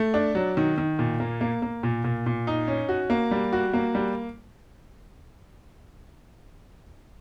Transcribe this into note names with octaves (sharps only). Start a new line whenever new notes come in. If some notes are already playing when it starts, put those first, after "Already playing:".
Already playing: A3
D4
F#3
D#3
D#3
A#2
A#3
A#3
A#3
A#2
A#2
A#2
D#4
C#4
F#4
A#3
G3
F#4
A#3
G3